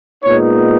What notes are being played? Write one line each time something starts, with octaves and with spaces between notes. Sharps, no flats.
A#2 G#3 B3 D#4 C#5